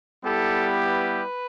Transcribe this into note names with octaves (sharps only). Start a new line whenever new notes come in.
G3 B3 E4 G4 A4
B4